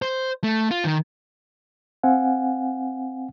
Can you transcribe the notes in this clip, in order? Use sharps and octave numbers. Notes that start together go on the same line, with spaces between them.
C5
A3
F4
D#3
C4 F5 F#5 G#5